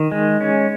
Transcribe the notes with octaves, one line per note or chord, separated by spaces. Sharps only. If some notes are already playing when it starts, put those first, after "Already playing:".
Already playing: D#3
G#3
C#4